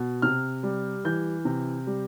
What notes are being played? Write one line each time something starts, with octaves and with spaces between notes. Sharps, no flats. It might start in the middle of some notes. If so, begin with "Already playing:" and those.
Already playing: B2
C3 F6
G3
E3 G6
C3
G3